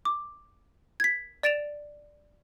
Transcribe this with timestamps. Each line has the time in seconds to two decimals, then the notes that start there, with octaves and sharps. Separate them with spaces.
0.05 D6
1.00 G#6 B6
1.43 D5 A6 D7 E7 F7